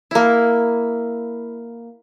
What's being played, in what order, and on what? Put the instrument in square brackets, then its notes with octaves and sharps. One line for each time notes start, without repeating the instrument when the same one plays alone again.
[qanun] A#3 E4